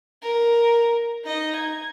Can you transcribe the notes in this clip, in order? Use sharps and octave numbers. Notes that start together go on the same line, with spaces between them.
A#4
D#4 D#5
G#6